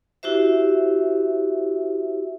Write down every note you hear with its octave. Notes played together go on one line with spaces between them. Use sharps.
E4 F#4 G4 C5 E5